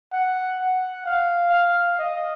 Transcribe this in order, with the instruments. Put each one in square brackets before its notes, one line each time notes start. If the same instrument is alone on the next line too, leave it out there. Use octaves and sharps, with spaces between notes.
[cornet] F#5
F#5
F5
F5
D#5